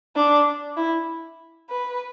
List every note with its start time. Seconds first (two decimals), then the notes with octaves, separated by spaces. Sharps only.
0.16 D4
0.77 E4
1.70 B4